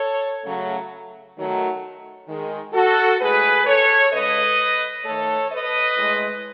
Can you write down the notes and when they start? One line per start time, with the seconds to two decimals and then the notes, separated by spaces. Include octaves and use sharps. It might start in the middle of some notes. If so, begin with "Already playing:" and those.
Already playing: A4 C#5
0.44 C#3 F#3 A3
1.36 D#3 F#3 A3
2.28 D#3 G#3
2.74 F#4 A4
3.20 A2 G#3 G#4 B4
3.66 A4 C#5
4.12 C#3 G#3 B4 D#5
5.04 D#3 A3 A4 C#5
5.50 B4 D#5
5.96 A2 G#3